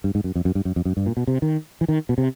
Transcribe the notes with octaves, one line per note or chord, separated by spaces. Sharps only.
G2
G#2
F#2
F2
F#2
G2
F#2
F2
F#2
G2
A#2
B2
C3
D#3
E3
D#3
B2
C3